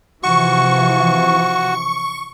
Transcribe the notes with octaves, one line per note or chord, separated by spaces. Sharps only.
C3 E3 F3 F#4 C#6